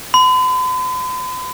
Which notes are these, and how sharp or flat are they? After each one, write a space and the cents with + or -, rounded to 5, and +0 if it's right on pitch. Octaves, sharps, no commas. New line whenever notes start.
B5 +45